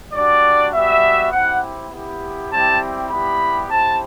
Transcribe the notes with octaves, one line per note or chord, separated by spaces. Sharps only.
G3 D4 F#4 D5
G3 B3 F#4 E5
C4 E4 G4 F#5
B3 E4 G4
G3 C4 E4 G4 A5
G3 B3 E4 G4 B5
C4 E4 G4 A5